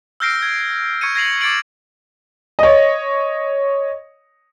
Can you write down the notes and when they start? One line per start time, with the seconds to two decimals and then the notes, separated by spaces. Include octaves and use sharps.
0.20 E6 F6 G6 A#6 C7 D7
0.42 G#6
1.01 C#6 G#6 C#7 D#7
1.15 G#6 A#6 C7 F7 F#7
1.41 D6 G#6 A6 C#7 D7 F#7
2.59 C#5 D#5